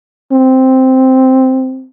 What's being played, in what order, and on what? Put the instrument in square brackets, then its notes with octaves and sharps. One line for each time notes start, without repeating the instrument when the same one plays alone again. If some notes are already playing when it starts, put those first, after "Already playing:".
[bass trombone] C4